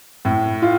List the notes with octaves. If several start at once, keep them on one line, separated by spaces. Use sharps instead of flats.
A2
F4